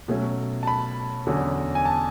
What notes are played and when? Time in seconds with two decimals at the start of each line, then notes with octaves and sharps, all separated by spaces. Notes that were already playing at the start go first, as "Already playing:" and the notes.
0.08 B2 F#3 A3 C#4
0.63 A5
0.67 B5
1.27 E2 D3 F#3 C#4
1.75 G#5
1.85 A5